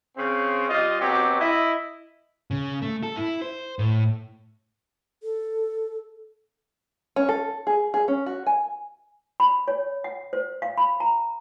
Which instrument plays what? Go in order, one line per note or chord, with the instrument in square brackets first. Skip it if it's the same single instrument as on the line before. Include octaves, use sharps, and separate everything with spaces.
[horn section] C#3 C4
G3 F4 D#5
B2 F#3 C4 G4
E4 D#5
[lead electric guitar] C#3
A3
A4
E4
C5
A2
[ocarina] A4
[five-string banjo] C#4
A4
G#4
G#4
C#4
F#4
G#5
[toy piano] B5
C#5
F#5
C5
F5
B5
A#5